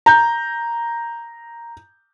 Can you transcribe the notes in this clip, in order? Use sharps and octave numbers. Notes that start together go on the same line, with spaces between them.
A#5 G6